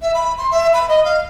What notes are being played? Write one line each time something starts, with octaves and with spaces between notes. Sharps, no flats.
E5
B5
C6
E5
B5
D#5
F5